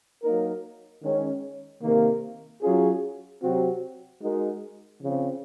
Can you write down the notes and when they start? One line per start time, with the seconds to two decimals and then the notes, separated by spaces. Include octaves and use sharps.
0.24 F#3 A#3 D#4 A#4
1.03 D#3 G#3 C#4
1.82 C3 D#3 A#3
2.63 F#3 C#4 F4 G#4
3.42 C3 F#3 C4 F#4
4.22 G#3 D#4 F#4 A#4
5.02 C#3 F3 C4